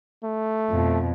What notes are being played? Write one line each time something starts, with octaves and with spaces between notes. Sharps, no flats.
A3
F2 B2